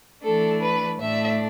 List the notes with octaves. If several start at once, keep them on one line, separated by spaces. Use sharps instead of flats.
E3 A3 D4 A4
B4
A2 A3 D4 E5